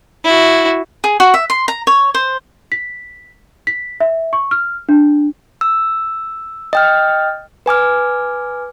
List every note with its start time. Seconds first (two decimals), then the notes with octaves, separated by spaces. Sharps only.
0.24 E4 F#4
1.04 G#4
1.20 F#4
1.34 E5
1.50 C6
1.68 A#5
1.87 C#5
2.15 C5
2.72 B6
3.67 B6
4.00 E5
4.33 C#6
4.51 F6
4.89 D4
5.61 E6
6.73 D#5 G5 F6
7.66 B4 G#5 D6 F6